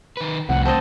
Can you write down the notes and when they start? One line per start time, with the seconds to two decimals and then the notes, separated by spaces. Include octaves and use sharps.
0.17 D#3 B4
0.49 C2 F2 A2 F#5
0.65 C4 D#5 A5